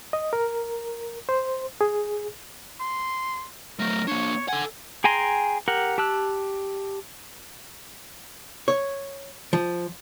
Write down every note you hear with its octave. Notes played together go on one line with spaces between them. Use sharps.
D#5
A#4
C5
G#4
C6
F#3 A3 A#4
A#3 D4 C#5
A4 F#5 G#5
G#4 G5 G#5 A#5 C6
G4 A#4 F#5
G4 A5 E6 F#6
C#5
F3